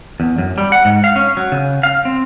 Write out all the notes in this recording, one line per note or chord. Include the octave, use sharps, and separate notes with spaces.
E2
F#2
G3
F#5
G#2
F5
C#4
F#3
C#3
F5
C4